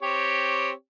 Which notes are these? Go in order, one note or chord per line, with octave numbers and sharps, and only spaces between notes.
C4 G4 C#5